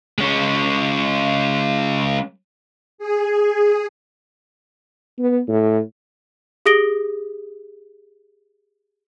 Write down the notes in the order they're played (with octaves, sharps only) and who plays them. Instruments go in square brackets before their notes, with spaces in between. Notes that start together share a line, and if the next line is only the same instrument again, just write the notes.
[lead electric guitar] G#3 C#4
[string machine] G#4
[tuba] B3
A2
[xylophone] G4 G#4 D#6 A#6 D7 G7